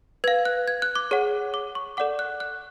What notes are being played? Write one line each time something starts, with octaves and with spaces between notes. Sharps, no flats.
B4 F5 G#6
F#6
G#6
F#6
D6
G#4 C#5 F#5
D6
C#6
A4 D5 F#5 D6
F#6
F#6